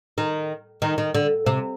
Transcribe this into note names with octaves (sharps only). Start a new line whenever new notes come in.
D#3
D#3
D#3
D3
C3